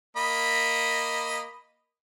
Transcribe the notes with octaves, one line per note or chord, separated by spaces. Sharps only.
A#3 D#5 B5